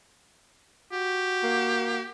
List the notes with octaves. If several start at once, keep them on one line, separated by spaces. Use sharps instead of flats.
F#4 G4
A#3